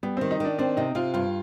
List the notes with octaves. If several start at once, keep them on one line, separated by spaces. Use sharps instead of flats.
G3 B3
D#3 C4
D#4
D#3 D4
C4 D4
C3 D#4
C3 F4
G2 F4